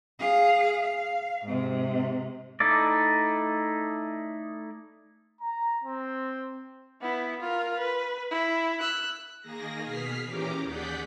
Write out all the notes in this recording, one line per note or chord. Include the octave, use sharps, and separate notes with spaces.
G#4 F5
F5
G#2 C3
A3 D#4 E4 D5
A#5
C4
B3 E4
F4 A#4
B4
E4
E6 F#6
D#3 A#3 G#4 A#6
B2 G#4 F6 B6 C7
A#2 E3 C#4 G4 A#5 D6
D#2 G#4 D5 F#5 G6 B6